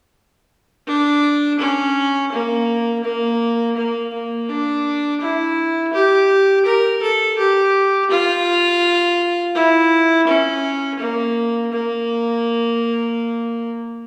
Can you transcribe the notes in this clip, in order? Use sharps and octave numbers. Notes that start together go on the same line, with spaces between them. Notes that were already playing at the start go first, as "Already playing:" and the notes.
D4
C#4
A#3
A#3
A#3
A#3
D4
E4
G4
A#4
A4
G4
F4
E4
C#4
A#3
A#3